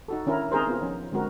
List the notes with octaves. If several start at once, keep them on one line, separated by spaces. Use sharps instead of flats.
D#4 F#4 A4
D#3 C#4 D4 E4 A#4
C4 D#4 G#4 A#4 C5
B3 C4 F4
F3 C#4 D#4
D3 G#3 C4 F#4 A#4